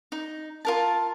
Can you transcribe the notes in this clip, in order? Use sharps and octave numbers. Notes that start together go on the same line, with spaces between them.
D#4
F4 A#4 A5